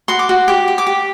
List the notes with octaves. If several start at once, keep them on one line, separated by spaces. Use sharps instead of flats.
F#4 C6
D6
F#4
G4 D6
G4
D6
G4